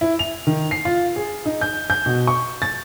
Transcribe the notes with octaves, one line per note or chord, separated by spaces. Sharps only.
E4
F7
D#3
C7
F4
G#4
D#4
G6
G6
B2
C#6
A6